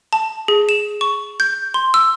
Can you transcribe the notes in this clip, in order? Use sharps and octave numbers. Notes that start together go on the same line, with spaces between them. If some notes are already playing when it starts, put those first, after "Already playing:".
A5
G#4
E7
C#6
G6
C6
E6